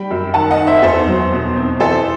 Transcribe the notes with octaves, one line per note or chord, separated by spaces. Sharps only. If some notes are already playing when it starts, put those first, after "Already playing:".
Already playing: G3 G5 B5
F#2
D#3 F#5 A5
D#5 F#5
D#3
C5 E5
E2 A4 C5
F#3
B2
C4
E3 A4 C5